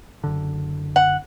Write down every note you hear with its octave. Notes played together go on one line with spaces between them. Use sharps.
F#1 D3
F#5